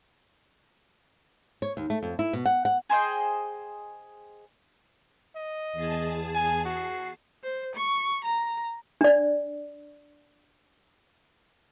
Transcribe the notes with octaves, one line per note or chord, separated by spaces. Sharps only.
C#5
D#2
A3
F2
E4
B2
F#5
F#5
G#4 C5 D#5 G5
D#5
E2 G#4 A5
G#5
F#4 C7
C5
C#6
A#5
D4 D5